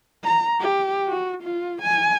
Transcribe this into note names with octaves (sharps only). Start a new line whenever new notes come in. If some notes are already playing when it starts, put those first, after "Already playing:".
A#5
G4
F#4
F4
G#5